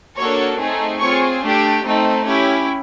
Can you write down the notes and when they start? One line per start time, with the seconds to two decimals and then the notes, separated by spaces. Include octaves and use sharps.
0.17 A#3 D4 F#4 A4 C#5 C#6
0.59 A3 C4 D#4 G#4
1.00 C4 F4 G#4 C#5 C#6
1.43 A3 D4 G4
1.84 A3 C4 D#4
2.26 C#4 E4 G4